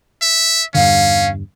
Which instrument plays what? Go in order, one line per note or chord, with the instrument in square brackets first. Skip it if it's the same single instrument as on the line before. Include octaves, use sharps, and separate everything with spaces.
[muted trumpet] E5
[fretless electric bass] E2 G2 D3 [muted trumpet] C#4 [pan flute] F5